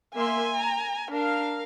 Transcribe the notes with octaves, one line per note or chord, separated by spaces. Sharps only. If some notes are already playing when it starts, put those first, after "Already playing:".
A#3 E5 G#5 C6
A#5
D4 A#4 F5